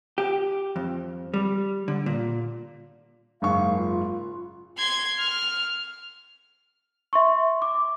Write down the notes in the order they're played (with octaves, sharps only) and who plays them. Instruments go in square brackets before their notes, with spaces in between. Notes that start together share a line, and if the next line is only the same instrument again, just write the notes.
[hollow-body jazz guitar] G4
F2
G3
D3
A#2
[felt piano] F#1 G#2 C#6 [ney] F5
[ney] F4
[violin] C6 G#6
F6
[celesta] E5 C6 C#6
D6